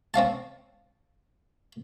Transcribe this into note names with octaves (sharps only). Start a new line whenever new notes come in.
C4 C#4 F5 A5